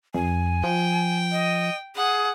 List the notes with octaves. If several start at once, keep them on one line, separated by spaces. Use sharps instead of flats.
F2 G#5
F3 G5
D#5
G#4 F#5